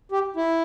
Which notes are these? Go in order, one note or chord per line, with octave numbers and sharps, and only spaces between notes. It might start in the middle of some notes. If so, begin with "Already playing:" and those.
G4
E4